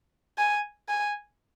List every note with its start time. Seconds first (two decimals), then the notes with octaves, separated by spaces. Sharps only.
0.38 G#5
0.89 G#5